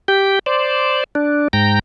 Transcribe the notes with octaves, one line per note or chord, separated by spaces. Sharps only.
G4 G5
C5 D5
D4
G#2 G5 A#5